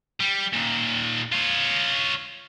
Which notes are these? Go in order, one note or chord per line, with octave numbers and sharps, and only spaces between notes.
G3
A#2 D#3
F4 C#5